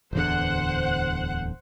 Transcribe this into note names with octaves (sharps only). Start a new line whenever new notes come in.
D1 E2 D3 C5 F#5